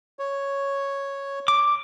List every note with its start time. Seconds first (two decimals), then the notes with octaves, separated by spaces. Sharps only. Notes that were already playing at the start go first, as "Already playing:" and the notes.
0.19 C#5
1.48 D6